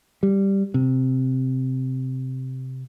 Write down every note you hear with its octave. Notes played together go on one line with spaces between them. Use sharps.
G3
C3